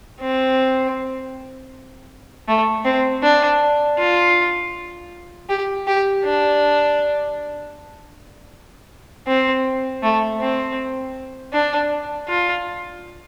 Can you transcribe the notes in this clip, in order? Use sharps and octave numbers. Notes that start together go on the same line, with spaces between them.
C4
A3
C4
D4
F4
G4
G4
D4
C4
A3
C4
D4
F4